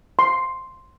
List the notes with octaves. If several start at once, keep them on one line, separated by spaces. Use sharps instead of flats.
C6